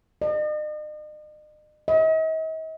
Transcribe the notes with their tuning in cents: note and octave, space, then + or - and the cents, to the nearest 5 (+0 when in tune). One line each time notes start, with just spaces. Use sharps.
D#5 -45
D#5 +45